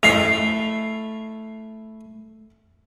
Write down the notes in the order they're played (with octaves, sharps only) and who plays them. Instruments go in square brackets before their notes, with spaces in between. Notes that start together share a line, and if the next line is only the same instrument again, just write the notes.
[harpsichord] A3 E4 [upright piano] C7 F7